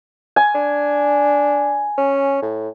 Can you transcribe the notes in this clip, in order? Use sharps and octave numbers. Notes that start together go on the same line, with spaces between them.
G#5
D4
C#4
A2